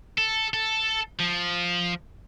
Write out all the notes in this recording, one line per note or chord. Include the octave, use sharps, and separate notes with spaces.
A4
A4
F3